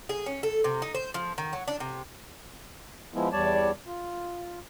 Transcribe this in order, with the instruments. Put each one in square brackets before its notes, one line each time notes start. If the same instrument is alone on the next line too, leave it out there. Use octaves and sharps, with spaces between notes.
[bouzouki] G#4
C#4
A4
C3
D#4
C5
F3
D#3
F#3
D4
C3
[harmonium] F3 G#3 B3 E4
E2 G3 C#5 D5 A5
F4